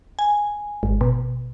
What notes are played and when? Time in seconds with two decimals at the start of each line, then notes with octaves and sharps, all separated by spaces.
0.19 G#5
0.83 G#1
1.01 B2